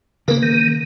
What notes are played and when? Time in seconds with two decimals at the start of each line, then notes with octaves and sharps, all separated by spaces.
0.28 C#3 A#3 A#4 B4
0.43 D#3